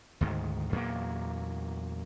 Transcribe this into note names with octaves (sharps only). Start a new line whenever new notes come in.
D2 G#2 D#3
E2 A#2 F#3 A#3